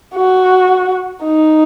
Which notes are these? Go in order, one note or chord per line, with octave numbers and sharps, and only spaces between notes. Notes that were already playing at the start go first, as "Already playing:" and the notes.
F#4
D#4